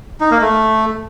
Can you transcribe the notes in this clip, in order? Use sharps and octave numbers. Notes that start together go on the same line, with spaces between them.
D#4
A#3
A3